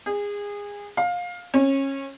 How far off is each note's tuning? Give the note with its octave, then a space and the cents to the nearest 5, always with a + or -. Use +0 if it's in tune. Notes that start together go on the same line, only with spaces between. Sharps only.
G#4 -25
F5 +20
C#4 -25